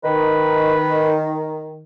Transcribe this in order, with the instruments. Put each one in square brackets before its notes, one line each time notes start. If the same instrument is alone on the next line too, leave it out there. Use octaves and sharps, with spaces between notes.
[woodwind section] D#3 [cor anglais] B4